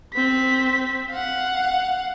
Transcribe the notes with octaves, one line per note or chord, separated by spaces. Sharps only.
C4 B6
F5 F#5